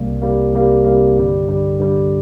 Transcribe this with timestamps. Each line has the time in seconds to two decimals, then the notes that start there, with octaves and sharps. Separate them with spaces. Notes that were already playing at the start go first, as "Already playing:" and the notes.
Already playing: C2 C3 G3 A#3
0.22 C2 C3 G3 A#3
0.53 C2 C3 G3 A#3
0.85 C2 C3 G3 A#3
1.17 G2 D3 G3
1.49 G2 D3 G3
1.80 G2 D3 G3